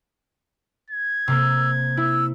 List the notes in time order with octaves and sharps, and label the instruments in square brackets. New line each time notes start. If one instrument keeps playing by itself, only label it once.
[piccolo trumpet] G#6
[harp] C3 A#3 A#4 [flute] E6
[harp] E4 [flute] E6